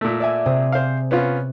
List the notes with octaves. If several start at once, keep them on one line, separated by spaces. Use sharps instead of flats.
A#2 A3
D5 E5 G#5
C3 C4 G#4
C5 F5
B3 C#4 F4